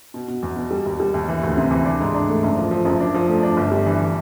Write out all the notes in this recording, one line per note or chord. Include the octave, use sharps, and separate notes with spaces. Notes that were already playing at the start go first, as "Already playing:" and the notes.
B2
B2
E2
B2
G3
D#2
G3
D#2
E3
D2
C3
E3
D4
G#2
D4
A3
F#1
F3
F3
F#1
D4
F3
A3
D4
G1
G3
E3
E3